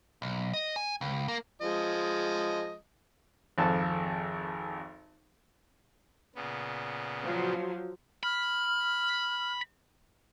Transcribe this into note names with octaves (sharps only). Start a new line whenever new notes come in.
B1
D#5
G#5
C#2
A#3
F3 G#3 D#5
G#1 F2 A4 A5
A#2 C#3 B3
F3 F#3
B5 F6